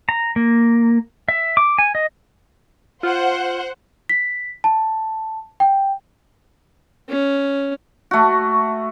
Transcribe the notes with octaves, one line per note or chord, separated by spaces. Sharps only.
A#5
A#3
E5
D6
G#5
D#5
F4 C5 F#5
B6
A5
G5
C#4
A3 F#4